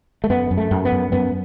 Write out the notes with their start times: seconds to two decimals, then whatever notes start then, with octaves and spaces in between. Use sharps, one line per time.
0.24 A3
0.30 F#2 B3
0.51 F#2
0.57 A3
0.71 F#2
0.85 B3
0.92 F#2
1.12 F#2 B3